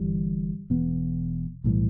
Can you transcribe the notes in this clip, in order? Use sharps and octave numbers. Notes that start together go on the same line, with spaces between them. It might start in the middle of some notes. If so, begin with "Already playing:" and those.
Already playing: G1 G2 E3 G3
E1 E2 B2 B3
B1 A2 E3 G3